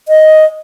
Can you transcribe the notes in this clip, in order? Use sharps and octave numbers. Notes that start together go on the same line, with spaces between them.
D#5